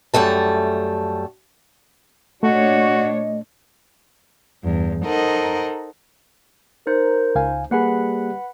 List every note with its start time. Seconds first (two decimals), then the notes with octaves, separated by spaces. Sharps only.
0.14 F#2 G3 A3 A5
2.43 A#2 A3 D4 F#4 C#5 D#5
4.62 E2 G2
5.04 D#4 A4 A#4 C5 D#5 F#5
6.87 D#4 A#4 C5
7.35 C#2 F5 G#5
7.71 G3 A#3 G#4 B4 F#5 B5